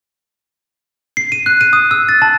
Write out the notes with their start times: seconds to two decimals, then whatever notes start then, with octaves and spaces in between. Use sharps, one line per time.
1.17 C7
1.32 D#7
1.46 F#6
1.61 D#7
1.73 D#6
1.91 E6
2.09 A6
2.22 A5